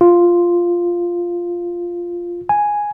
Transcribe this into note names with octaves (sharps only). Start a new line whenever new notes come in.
F4
G#5